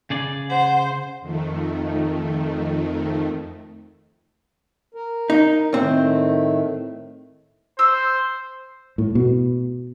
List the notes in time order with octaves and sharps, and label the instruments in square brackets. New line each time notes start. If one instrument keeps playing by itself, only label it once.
[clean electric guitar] C#3 G#4 D5
[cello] C5 [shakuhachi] F#5
[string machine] F2 D#3 A3
[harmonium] A#4
[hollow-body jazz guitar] D#4
[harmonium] A2 D#3 A3 [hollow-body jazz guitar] C4
[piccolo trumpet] C5 [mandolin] E6
[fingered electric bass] A2
B2